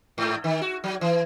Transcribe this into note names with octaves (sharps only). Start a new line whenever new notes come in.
G#2
D#3
F#4
F#3
E3